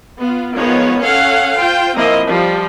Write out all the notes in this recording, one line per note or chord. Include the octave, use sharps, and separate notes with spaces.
B3 F4
D#3 F3 G#3 B3 C#5
C#4 A4 C#5 F5 F#5
F4 C5 G5
F3 A#3 C4 E4 A#4 D#5
F3 G3